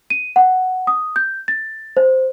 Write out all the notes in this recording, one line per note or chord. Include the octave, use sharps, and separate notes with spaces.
D#7
F#5
D#6
G6
A6
C5